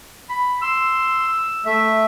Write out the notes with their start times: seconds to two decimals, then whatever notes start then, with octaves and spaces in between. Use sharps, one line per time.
0.29 B5
0.62 C6 E6
1.66 A3 E5